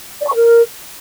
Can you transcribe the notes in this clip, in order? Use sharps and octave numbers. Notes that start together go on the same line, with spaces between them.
D5
C#6
A#4